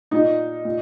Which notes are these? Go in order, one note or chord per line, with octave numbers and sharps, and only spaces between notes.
A#2 D#4
A#2